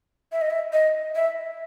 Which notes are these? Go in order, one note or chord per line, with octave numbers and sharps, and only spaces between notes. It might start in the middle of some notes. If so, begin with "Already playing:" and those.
E5
D#5
E5
D#5
E5